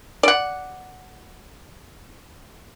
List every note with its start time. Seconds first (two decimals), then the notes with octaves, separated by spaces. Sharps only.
0.23 D5 F#5